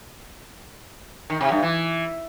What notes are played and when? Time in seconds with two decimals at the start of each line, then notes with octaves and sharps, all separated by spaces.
1.30 D#3
1.41 C3
1.52 G2
1.62 E3